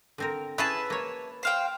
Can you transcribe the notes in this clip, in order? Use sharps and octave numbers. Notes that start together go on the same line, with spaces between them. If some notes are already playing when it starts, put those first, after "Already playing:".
D3 C4 A#4
C#4 E4 G#4 B4 E5 A5
A#3 C#5
C5 F5 G5